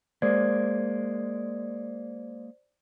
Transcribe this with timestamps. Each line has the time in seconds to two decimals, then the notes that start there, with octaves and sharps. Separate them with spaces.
0.22 G#3 A#3 C5 D5 G#6